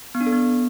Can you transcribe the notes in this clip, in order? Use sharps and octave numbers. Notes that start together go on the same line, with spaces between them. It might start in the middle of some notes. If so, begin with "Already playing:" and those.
B3
D4
A4
B3